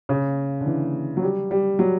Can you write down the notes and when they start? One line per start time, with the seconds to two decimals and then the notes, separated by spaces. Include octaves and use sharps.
0.09 C#3
0.61 D3
0.66 E3
1.17 F#3
1.23 G3
1.51 G3
1.79 F#3